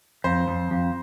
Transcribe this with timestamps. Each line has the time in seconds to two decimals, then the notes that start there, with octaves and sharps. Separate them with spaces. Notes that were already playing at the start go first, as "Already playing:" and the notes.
0.24 F2 C5
0.48 F2
0.71 F2